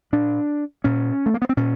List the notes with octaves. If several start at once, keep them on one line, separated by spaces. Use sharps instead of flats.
A#2 D4
A#2 C#4
A3
A#3
B3
C4
A#2 C#4